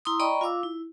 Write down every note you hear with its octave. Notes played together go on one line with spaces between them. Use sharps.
E4 A#5 C6 D#6
D5 D#5 G5 A#5 B5 C#6
F4 F5 D6 E6
E4